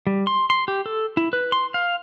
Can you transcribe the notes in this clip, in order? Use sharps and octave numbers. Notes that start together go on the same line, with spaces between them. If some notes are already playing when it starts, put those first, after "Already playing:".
G3
C6
C6
G4
A4
E4
B4
C6
F5